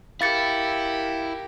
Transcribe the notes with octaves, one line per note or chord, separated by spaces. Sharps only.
E4 G4 A#4 F5 A6 C#7